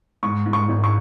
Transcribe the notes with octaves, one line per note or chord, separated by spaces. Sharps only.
G#2 C#6
G#2
C#6
G#1
C#6